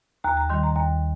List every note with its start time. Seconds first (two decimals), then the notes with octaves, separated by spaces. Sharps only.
0.24 D#2 A#5
0.37 A#5
0.49 D#3 G3 C6
0.63 A#5
0.76 D#2 A#5